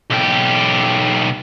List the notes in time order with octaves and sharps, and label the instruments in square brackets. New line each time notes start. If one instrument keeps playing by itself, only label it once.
[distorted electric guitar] B1 G4